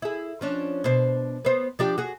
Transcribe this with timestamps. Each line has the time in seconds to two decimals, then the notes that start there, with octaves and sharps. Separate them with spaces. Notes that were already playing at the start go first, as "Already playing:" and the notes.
0.02 E4 G#4
0.41 F3 C#4 D4
0.84 B2 D4 C5
1.45 B3 C5
1.79 F3 D4 G4
1.98 F#4 G#4